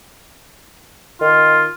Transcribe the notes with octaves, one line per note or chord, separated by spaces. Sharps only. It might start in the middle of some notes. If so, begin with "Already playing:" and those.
D#3 F4